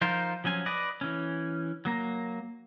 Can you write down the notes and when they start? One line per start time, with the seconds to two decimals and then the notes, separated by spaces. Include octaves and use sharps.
0.01 F3 D#4 F4 A#4 C5
0.44 F3 F#3 C#4 G#5
0.66 B4 D5 D#5
1.01 E3 C#4
1.85 F#3 A#3 A#5